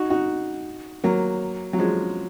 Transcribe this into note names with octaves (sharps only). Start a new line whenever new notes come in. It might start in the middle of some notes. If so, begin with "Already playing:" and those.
Already playing: D#4 F#4
D#4 F#4
F#3 A#3
F#3
F3 G#3